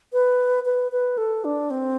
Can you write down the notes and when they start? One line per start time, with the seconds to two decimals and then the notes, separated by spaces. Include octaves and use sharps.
0.13 B4
0.66 B4
0.92 B4
1.18 A4
1.45 D4
1.71 C4